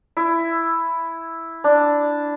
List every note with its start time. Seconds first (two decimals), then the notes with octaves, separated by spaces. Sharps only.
0.17 E4
1.64 D4